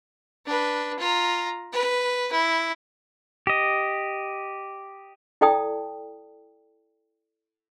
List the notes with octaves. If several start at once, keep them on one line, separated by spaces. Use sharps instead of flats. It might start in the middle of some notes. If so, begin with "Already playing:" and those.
D4 B4
F4 A#5
B4
E4
G4 D#5
E4 A4 D5 G5 A5 D#6